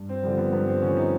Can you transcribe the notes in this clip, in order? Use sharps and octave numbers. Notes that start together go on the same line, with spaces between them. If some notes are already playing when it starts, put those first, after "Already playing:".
Already playing: G2
C4
D3 F3 G3
B3
G2 B3
C4
D3 F3 C#4
D#4